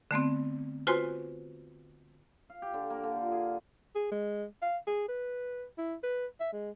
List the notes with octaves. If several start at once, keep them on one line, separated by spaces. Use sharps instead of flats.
D3 A3 B3 C4
F4 F#4 B4 C5 G#5 C6
F5
G4
D3
A#3
D3
F4
G#4
G#4
G#3
F5
G#4
B4
E4
B4
E5
G#3